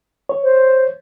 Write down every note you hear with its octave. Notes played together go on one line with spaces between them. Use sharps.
C#5
C5